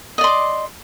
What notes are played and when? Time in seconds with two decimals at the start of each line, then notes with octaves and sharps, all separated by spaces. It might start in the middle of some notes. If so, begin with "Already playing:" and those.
0.18 D#5
0.21 D5
0.24 C6
0.27 D6